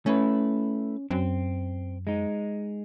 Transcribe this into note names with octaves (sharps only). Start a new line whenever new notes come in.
A3 C#4 E4 B4
F#2 C4
G#3 D#4